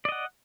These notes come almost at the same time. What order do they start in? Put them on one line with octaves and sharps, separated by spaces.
D5 D#5 F#5